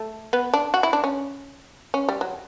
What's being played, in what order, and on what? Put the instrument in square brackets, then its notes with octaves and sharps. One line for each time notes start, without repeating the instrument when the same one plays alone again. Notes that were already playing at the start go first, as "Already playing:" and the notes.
Already playing: [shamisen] A3
B3
D4
F#4
E4
D4
C#4
C#4
G3
F#3